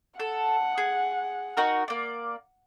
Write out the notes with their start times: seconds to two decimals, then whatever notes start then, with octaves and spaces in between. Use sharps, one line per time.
0.20 A4 F#5
0.78 G#4
1.57 D#4 F#4 A#4
1.88 A#3 D5